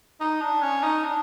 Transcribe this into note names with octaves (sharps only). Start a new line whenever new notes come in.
D#4
D4
C#4
D#4
D4